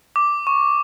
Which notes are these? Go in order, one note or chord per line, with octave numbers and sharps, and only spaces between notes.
D6
C#6